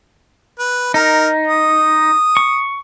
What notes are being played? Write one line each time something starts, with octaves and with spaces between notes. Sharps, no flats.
B4
D#4 A#4
D#6
C#6